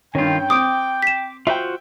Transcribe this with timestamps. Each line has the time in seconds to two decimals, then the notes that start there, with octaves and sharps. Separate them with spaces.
0.15 G2 D#3 C#4 F4 G5
0.50 C4 D6 D#6 D7
1.02 B6 E7
1.47 F4 F#4 C5 E5 G5